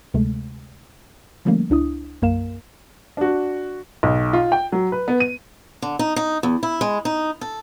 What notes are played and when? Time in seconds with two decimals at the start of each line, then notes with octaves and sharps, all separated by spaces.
0.14 D2 C3 G#3 A3
1.45 D3 F3 G3 A3 A#3 C#4
1.70 C#2 D4 E4 D#6
2.22 B1 F#2 A#3 A#4 F5 E7
3.17 D4 F#4
4.03 B1
4.33 F4
4.52 G5
4.72 F#3
4.92 B4
5.08 B3
5.20 D#7
5.82 D3
5.99 D#4
6.16 D#4
6.43 E2
6.63 E4
6.81 G#3
7.05 D#4
7.41 A4